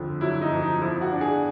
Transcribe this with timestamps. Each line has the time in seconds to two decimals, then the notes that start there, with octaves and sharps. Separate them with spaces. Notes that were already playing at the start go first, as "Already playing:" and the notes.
Already playing: F2 D3
0.21 F#3 E4
0.42 D#4
0.52 F2
0.62 D#4
0.82 F3 E4
1.01 F#4
1.11 D4
1.21 G#4